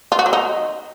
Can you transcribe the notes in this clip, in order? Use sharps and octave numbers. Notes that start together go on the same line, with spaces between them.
F4
F#4
F#3
D#4